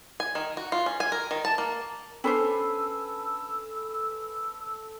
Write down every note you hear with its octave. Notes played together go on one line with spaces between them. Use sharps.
G#5
D#3
F#4
F4
C#4
G#5
A#4
D#3
A5
A#3
C#4 D4 A4 B4 C5 G#5 E6